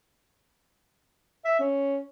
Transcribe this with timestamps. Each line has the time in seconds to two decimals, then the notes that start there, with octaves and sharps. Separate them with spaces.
1.45 E5
1.60 C#4